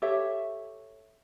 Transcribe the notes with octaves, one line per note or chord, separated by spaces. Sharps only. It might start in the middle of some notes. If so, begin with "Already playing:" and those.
G4 A4 C#5 E5